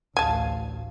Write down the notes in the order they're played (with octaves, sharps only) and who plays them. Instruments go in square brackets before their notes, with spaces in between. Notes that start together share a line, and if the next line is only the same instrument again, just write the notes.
[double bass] A1 D2 [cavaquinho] F5 [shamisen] G#5 A5